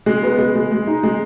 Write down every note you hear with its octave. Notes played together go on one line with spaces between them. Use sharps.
G#3
B3
G#3
G#3
G#3
D#4
G#3